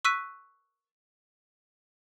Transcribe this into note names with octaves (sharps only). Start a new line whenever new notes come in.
C#6 E6 F#6 B6 D#7